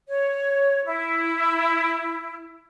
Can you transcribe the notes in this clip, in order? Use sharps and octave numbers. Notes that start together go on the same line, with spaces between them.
C#5
E4